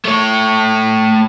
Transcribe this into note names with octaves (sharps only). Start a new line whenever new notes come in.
A3 C#5